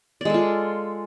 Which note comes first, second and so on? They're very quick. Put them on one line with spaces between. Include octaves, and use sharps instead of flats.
D5 G#3 A4 F4